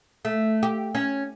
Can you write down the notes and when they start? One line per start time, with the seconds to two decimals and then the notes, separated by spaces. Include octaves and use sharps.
0.25 A3
0.63 G4
0.95 C#4